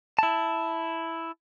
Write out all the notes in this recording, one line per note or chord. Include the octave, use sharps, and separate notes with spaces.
E4 A5